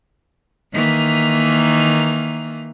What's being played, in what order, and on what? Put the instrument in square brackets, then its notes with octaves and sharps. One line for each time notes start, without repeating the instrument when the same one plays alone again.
[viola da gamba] D#3 E3 A#3